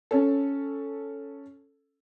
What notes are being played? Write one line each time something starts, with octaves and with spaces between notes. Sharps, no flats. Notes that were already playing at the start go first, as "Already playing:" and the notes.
C#4 A4